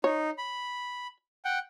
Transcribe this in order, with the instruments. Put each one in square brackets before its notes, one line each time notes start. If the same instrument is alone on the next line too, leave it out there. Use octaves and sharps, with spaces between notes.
[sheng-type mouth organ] D#4 [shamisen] C#5
[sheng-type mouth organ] B5
F#5 G5